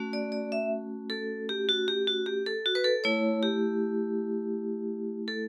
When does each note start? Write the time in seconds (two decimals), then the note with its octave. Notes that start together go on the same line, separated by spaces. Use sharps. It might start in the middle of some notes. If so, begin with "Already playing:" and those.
Already playing: A3 C#4 F#4
0.13 D5
0.32 D5
0.52 E5
1.10 A4
1.49 G4
1.69 F#4
1.88 G4
2.07 F#4
2.26 G4
2.46 A4
2.66 F#4
2.75 B4
2.84 A4
3.04 A3 E4 C#5
3.43 G4
5.28 A4